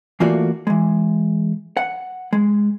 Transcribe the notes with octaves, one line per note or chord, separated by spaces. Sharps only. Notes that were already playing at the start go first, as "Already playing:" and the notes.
E3 A3 A#3 F4 F#4 D5
E3 G#3
F#5
G#3